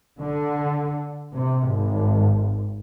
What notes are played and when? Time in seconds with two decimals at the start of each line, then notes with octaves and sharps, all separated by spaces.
0.20 D3
1.33 C3
1.69 G#1